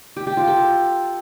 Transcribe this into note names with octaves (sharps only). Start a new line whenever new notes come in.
G4
G4
F4
A4